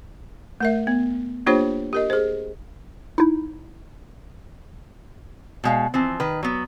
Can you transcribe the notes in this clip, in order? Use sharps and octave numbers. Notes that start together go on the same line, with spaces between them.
A3 A#4 E5
B3
A#3 D4 F4 G4 C5 C#5
G4 A#4 D#5
G#4 C5
D#4 E4
B2 G#3 F5
E3 F3 C4
D#3 B4
F#3 B3